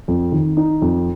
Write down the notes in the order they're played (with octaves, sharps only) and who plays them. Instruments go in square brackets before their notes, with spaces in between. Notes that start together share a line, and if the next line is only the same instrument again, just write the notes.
[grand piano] F2
D#3
D#4
F2